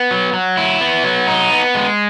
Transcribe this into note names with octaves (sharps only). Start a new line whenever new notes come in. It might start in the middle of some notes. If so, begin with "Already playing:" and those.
Already playing: B3
F#3
F#3
E4
B3
F#3
D#4
B3
G#3